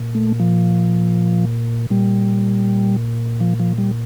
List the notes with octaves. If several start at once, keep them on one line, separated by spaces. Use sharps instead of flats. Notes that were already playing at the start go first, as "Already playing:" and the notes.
Already playing: A#2
A3
F3
A#2 G3
F3
F3
G3